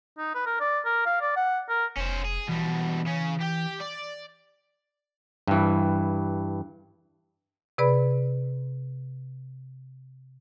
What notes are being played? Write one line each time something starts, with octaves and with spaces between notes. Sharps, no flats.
D#4
B4
A#4
D5
A#4
F5
D5
F#5
A#4
F1 C#4 C5
G#4
B2 E3 G3
C#3 C#4
G4 G5
D5
G2 E3
C3 G#4 B4 D5 B5